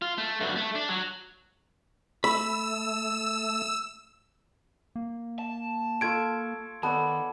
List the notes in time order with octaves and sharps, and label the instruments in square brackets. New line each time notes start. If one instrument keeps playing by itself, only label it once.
[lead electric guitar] F4
A3
G2 F#3
A3
D4
F#3
[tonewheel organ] A3 [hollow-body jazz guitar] B5 [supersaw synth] E6
[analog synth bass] A#3
[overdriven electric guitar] A5
[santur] F4 A4 C#6 [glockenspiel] G#6 D7
[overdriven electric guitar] D#3 [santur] B3 A4 D5 [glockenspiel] A5